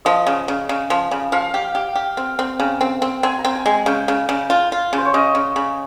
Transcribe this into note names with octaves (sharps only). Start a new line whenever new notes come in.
F3 D#5
C#3
C#3
C#3
F3
C#3
F3 F5
G4
G4
G4
C4
C4
C#3
C4
C4
C4 G#5
A#5
C4
G#5
G#3
G#5
C#3 G5
C#3
C#3
F4
F4
C#3
C5
C#5
C#3 D#5
C#3
C#3